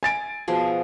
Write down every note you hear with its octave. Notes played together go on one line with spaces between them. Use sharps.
G#5 A6 D7
B2 F3 G#4